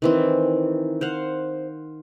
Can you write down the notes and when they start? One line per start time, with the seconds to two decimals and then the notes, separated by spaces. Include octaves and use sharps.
0.02 D#3 E3 C4
1.01 C5 F5 F#5